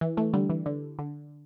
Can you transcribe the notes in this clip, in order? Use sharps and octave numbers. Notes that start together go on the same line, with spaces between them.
E3
E3 A3
D3 G3
E3
D3
D3